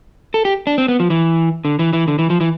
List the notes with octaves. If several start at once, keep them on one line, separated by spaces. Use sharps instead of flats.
A4
G4
D4
C4
B3
F3
E3
D3
E3
E3
D3
E3
F3
E3